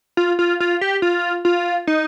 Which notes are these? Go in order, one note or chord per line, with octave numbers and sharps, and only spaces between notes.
F4
F4
F4
G4
F4
F4
D#4